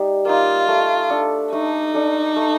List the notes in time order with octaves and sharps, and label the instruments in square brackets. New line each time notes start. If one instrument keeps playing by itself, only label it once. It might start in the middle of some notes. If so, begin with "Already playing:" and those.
Already playing: [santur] G3 D#4
[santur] A#3 D#4 [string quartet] F4
[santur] A3
D4 A4
[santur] A3 [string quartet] D#4
[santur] D4 A4
A3